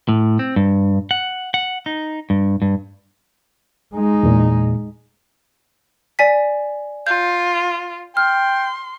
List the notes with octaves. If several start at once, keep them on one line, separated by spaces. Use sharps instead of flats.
A2
C4
G2
F#5
F#5
D#4
G2
G2
G#3 D#4
E2 A#2
D5 G#5 B6
F4 G6
G5 C6 F6